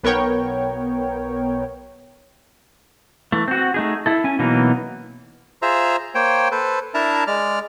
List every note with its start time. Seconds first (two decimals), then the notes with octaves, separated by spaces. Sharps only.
0.03 B1 B3 A#4 C#5 G5
3.32 E3 A3
3.48 C4 F#4
3.74 A3 D#4 G#4
4.06 E4 A4
4.24 C#4 G#5
4.39 B2 E3 F#3 A#3 D#4
5.62 F4 G#4 C5 E5 A#5 E6
6.15 A#3 C5 C#5 G5
6.51 A4 B4 C5
6.94 D4 E4 A#4 E5 A5 A#5
7.27 G#3 D5 F6